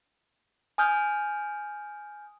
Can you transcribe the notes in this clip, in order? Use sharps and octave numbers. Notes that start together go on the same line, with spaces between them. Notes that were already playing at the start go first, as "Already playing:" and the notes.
G#5 D#6 F6 G6